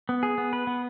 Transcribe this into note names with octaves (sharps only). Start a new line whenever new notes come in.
B3
G#4
B3
B4
B3